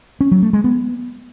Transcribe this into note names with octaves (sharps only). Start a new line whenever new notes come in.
C#4
F#3
A3
G#3
B3